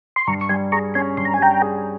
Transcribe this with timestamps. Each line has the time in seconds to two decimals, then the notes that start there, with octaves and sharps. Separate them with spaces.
0.16 C6
0.27 G2 A#5 C#6
0.41 C#6
0.49 G3 G#5 C6
0.72 G#4 A#5 C#6
0.94 C#4 G#5 C6
1.17 G2 C6
1.25 A#5
1.34 G#5
1.39 G3 G5 A#5
1.62 G#4